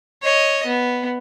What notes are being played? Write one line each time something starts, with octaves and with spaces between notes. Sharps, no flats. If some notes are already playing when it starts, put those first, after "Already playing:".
C#5 D#5
B3